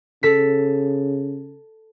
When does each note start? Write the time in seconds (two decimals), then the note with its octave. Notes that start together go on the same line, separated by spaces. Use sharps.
0.23 C#3 A4 B6